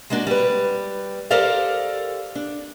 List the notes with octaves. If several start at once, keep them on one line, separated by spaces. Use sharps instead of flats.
G#3 A#3 B3 D4 F#4
G3 B4
G4 A4 A#4 C5 D5 F5
D4